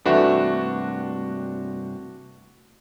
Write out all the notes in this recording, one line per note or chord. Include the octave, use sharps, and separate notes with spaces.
G2 C3 E3 A3 D4 F#4 E5